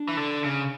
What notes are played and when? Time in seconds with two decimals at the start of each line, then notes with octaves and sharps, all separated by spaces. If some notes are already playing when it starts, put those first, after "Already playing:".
Already playing: D4
0.09 E3
0.17 D3
0.44 C#3